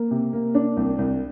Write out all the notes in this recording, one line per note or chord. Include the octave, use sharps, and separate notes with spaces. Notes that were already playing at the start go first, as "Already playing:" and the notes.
Already playing: A#3
C3
A#3
D4
C2
C2